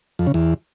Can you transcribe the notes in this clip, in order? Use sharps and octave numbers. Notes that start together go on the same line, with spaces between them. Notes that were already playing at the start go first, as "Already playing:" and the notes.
F2
C#3
E2